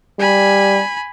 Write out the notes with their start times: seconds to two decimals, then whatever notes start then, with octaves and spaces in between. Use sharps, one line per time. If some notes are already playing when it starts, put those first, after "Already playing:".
0.19 G3 G#5 B5